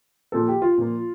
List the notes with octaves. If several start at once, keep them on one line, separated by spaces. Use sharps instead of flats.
A#2 F3 A#3 A4
G4
F4
A#2 F3 A#3